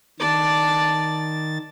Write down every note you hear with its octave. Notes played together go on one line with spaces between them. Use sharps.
D#3 D5 A5 A6